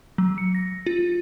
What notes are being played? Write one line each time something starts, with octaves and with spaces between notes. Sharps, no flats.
F#3
C#7
A#6
F4